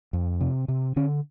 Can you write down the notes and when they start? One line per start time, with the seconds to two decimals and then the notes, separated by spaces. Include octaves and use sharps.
0.13 F2
0.41 C3
0.68 C3
0.96 D3 C#4